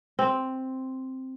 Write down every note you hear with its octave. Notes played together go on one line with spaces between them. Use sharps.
C4